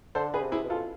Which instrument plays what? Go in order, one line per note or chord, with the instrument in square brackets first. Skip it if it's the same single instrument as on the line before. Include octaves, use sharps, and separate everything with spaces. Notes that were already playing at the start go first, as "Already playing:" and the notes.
[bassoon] D3 [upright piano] A4 C5
[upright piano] G#4 B4
[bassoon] C3
[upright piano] E4 G#4
[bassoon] B2
[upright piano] F4 A4